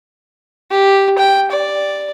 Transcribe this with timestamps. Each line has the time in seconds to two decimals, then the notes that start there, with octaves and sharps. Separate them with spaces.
0.71 G4
1.19 G5
1.51 D5